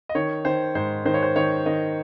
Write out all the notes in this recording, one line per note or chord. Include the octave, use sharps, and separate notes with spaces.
D#5
D#3 C#5
D#3 C5
G#2 C5
D#3 C5
C#5
C5
D#3 C#5
D#3 D#5